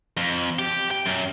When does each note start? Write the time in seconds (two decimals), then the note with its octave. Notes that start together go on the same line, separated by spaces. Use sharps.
0.17 F2
0.59 G4
0.91 G5
1.06 F#2